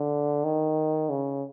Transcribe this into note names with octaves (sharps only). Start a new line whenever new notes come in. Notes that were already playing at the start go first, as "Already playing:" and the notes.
Already playing: D3
D#3
C#3